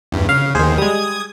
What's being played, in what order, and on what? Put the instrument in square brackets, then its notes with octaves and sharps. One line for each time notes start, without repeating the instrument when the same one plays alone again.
[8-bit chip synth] E2 G2
[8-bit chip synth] C#3 [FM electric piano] F5
[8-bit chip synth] D#2 D#3 [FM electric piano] G#4 C5
[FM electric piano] G3 G#3 [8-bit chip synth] D#6 G#6